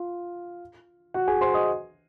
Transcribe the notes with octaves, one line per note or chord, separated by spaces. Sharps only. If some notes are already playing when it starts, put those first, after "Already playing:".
Already playing: F4
F#4 F#5
G#4 G#5
C5 C6
D#5 D#6